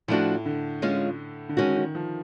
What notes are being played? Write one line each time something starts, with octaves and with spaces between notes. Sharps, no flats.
A2 F3 A3 D4 F#4
D3
G#3 C#4 F4
D3
D#3 G#3 C#4 F#4
D#3
F3